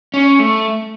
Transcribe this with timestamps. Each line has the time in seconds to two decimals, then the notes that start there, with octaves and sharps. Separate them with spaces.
0.14 C#4
0.39 A3